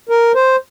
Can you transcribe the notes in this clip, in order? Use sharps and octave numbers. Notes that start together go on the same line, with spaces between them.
A#4
C5